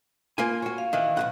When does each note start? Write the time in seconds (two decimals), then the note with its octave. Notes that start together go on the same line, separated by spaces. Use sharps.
0.38 A#3 F4 G#5
0.62 F#4 C#5
0.78 F5
0.93 D#3 E3
1.17 B1 D#3 F#5